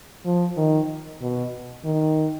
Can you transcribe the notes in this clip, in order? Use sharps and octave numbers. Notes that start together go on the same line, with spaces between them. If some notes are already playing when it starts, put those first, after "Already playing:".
F3
D#3
B2
D#3